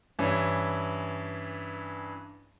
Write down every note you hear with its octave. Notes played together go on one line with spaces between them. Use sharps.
G2 E3 C#4